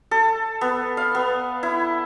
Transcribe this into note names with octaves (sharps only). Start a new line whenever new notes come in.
A4
B3
F5
B3
E4